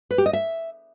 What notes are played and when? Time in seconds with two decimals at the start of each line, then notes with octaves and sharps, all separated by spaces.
0.11 B4
0.18 G4
0.26 D#5
0.33 E5